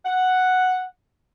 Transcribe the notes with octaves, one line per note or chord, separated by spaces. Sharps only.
F#5